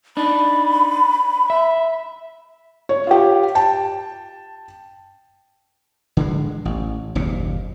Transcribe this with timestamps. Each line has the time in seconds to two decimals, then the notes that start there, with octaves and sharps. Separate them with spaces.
0.17 D4 D#4 B5
1.50 E5
2.89 C#5
3.07 F4 G4
3.55 G5 A5
6.17 D3 E3 G#3
6.65 A1
7.15 F#1 D#2 A#2